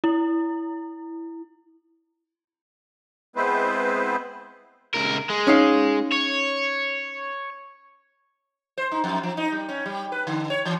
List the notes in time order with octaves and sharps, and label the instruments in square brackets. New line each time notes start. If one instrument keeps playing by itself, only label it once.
[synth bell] E4
[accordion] G#3 B3 C4 E4 B4 C5
[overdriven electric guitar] C#2 A#4
G#3
[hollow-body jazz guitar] C#4 D#4 F5
[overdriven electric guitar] C#5
[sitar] C5
D#4
F2
F3
D#4
G3
C#4
G3
B4
D3
C#5
E3